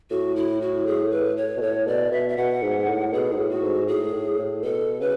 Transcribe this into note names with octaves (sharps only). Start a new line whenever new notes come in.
A2 F#4
E4
F#4
G#4
B4
C#5
B2
A2 C#5
B2 D5
B2 E5
E5
B2 F#5
G#2
A2
B2 G#4
G#2
A2
F#4
G#2
A2 G#4
A2
A2
B2 A4
C#3 B4